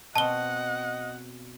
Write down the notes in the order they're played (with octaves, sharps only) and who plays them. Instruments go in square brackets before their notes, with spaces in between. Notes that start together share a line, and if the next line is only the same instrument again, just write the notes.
[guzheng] B2 C4 [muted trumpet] D#5 [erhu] F#5 [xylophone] A5 G7